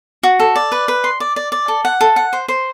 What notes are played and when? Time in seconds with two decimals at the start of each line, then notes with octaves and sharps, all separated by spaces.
0.23 F#4
0.40 A4
0.56 D5
0.72 B4
0.88 B4
1.04 C6
1.20 D5
1.36 D5
1.52 D5
1.68 A4
1.85 F#5
2.01 A4
2.16 F#5
2.33 C5
2.48 C5